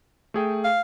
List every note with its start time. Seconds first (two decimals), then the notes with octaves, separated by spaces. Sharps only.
0.34 A3 G#4 G5
0.64 F5